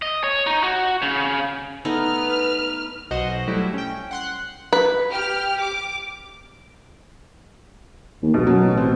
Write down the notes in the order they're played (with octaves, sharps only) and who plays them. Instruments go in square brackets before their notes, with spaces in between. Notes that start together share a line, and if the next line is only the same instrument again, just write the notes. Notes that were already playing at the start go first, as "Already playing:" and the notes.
[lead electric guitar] D#5
C#5
D#4
F#4
C#3
[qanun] A3 B3 D#4 [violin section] B4 F6
[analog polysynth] B1 B2 F#4 C5 D#5 F#5
F#3 G3 A3 E4
C#4 G5
F#5 C6 F#6
[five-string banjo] B4
[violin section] G4 F6
D6
[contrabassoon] D#2
[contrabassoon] B1 [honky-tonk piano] B2
[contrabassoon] F#2 [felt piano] F#3
[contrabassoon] A1
[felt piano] C4